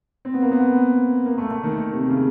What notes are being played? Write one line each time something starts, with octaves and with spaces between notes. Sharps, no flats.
C4
B3
A#3
B3
A#3
A3
A3
D#3
C3
C#3